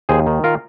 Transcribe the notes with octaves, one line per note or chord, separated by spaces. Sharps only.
D#2 G#4 C5
D#3
F4 A#4